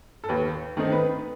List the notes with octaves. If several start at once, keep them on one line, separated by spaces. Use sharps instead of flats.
A4
D#2 B4
D#3 A3 C4 D#4
B4